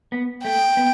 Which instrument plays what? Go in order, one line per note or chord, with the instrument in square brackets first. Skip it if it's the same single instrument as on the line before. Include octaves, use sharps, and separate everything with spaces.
[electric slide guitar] B3
[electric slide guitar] A3 [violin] G5
[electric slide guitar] B3